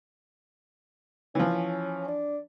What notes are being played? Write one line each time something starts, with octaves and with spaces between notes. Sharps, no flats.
E3 F3 C#4
D4